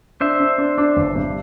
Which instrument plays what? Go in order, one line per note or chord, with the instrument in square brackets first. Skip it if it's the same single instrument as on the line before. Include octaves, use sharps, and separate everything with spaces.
[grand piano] D4 [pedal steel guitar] C5 E5
[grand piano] D4
D4
D4
G1
G2